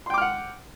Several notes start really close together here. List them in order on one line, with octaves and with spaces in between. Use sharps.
C6 G5 D6 F6 F#5